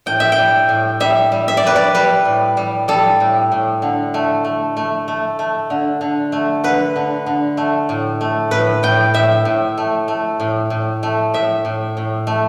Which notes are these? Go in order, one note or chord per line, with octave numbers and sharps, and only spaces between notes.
A2 G5
E5
G5
G3
A2
G3 E5
G3
E5
D5
G3 B4
D5
G3 B4
A2
G3
G3 A4
A2
A2
D3
A3
A3
A3
A3
A3
D3
D3
A3
D3 B4
D3
D3
A3
A2
A3
A2 B4
A2 G5
A2 E5
A2
A3
A3
A2
A2
A3
A2 E5
A2
A2
A3